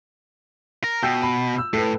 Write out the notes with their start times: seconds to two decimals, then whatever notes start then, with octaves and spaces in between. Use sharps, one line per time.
0.84 A#4
1.03 B2 G5 E6 G6
1.22 B5
1.58 E6
1.73 A2 A4 B4